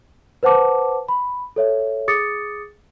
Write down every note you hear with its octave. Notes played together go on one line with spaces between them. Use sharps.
B4 C5 F#5 A5 D6
B5
A4 C#5 E5
G#4 D6 D#6 A6 C#7